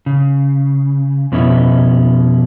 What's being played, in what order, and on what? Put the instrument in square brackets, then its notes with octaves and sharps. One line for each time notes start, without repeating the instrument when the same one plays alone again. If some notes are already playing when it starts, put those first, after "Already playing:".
[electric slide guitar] C#3
F2 B2 C#4 E4